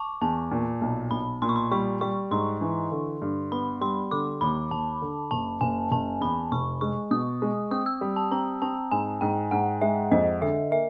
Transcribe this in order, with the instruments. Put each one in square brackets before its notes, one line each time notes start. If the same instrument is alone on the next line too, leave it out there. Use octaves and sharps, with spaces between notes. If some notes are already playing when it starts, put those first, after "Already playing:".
Already playing: [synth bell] A5 C#6 D6
[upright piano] E2 [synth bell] A5
[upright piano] A#2
B1
[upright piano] B1 [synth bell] B5
[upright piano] A#2 [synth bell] C6
[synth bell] C#6
C6
[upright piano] G3 [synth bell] C#6
[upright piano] G3 [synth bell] C#6
[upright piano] G#2 [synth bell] C6
[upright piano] E3
D3
G2
[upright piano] B3 [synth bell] B5
[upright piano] G3 [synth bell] C6
[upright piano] D3 [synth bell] D6
[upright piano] D#2 [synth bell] B5
[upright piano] D#2 [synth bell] A5
[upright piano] D3
[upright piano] F#1 [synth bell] A5
[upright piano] F#1 [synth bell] G#5
[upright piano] F#1 [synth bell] A5
[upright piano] E2 [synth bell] B5
[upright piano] F1 [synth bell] C#6
[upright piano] G#3 [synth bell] C#6
[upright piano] B2 [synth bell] D#6
[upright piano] G#3
[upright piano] C4 [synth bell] D#6
[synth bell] E6
[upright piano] G3
[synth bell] A5
[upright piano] C4 [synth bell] A#5
[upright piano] C4 [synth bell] A5
[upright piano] G#2 [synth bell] G#5
[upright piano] G#2 [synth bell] G5
[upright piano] G#2 [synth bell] F#5
[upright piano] G#3 [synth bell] E5
[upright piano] F2 [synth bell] D#5
[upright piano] D3 [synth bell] E5
[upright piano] A#3 [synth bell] E5